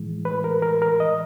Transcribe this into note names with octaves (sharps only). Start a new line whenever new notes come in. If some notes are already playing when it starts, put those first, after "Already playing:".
Already playing: A2 E3 G#3
B4
A#4
A#4
A#4
D#5